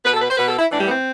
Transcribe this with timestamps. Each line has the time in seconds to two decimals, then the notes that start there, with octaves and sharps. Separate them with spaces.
0.06 B2 B4
0.14 A4
0.22 B4
0.30 C5
0.38 B2 B4
0.49 A4
0.59 E4
0.70 A2 E3 D4
0.80 G3
0.87 B3
0.91 C4